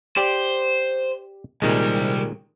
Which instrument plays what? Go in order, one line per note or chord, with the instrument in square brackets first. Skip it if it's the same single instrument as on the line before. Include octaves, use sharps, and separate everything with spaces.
[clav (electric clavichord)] G4 D5 G5 [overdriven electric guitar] C5
[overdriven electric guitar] C2 G3 [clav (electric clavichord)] A#2 D#3 G#3